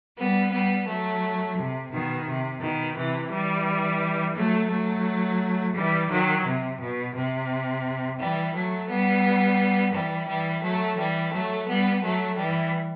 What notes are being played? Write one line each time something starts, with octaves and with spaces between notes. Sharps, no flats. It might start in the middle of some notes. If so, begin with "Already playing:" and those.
G3 B3
G3 B3
F#3 A3
C3
B2 D#3
C3
B2 D#3
C3 E3
E3 G3
F#3 A3
F#3 A3
E3 G3
D#3 F#3
C3
B2
C3
E3 G3
F#3 A3
G3 B3
E3 G3
E3 G3
F#3 A3
E3 G3
F#3 A3
G3 B3
F#3 A3
E3 G3